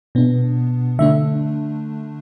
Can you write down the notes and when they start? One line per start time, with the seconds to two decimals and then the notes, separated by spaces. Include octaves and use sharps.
0.15 B2 B3 D4
0.99 D3 A3 D4 E5